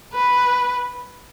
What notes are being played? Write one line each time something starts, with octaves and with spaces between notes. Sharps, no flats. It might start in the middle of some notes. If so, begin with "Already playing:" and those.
B4